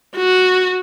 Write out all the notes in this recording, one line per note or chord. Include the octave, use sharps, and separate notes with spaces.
F#4